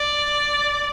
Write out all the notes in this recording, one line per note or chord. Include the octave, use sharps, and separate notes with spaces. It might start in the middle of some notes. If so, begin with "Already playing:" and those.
Already playing: D5